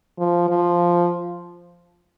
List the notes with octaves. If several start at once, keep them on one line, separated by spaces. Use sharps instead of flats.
F3
F3